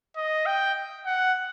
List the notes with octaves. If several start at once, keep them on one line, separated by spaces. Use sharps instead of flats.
D#5
G5
F#5